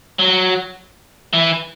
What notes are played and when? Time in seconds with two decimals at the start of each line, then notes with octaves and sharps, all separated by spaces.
0.19 F#3
1.33 E3